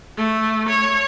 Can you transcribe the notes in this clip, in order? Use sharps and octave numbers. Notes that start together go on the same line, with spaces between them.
A3
C#5